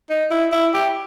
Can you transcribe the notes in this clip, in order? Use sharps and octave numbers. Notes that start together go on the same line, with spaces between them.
D#4
E4
E4
G4